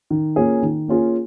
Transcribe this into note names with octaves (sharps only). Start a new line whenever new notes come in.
D#3
A#3 C#4 F4 G#4
D#3
A#3 C#4 F4 G#4